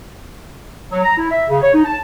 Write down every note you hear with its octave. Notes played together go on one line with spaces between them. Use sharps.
F#3
A#5
E4
E5
C#3
C#5
D#4
A5